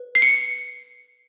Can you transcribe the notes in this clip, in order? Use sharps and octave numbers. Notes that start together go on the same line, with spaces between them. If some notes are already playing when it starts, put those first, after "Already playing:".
Already playing: B4
C7
C#7